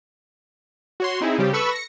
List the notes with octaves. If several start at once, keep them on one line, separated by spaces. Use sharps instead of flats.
F#4 C#5 C6
C4 D#4 E4 G#4
C#3 G3 C4 G4
A4 B4 B5 C#6 E6
A#6 C#7